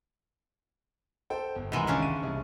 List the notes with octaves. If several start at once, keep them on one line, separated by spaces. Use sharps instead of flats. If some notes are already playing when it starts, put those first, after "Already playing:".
A4 C5 G5
G1
C2 B2 D#3 E3 G#3 A#5
C#3 C#4 D4
D#7
C2